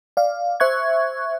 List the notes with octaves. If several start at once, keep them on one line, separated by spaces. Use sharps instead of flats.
D5 F5
C5 E5 C#6 F#6 G#6